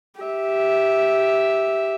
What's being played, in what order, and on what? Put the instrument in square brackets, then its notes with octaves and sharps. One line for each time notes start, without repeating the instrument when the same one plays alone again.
[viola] G4 E5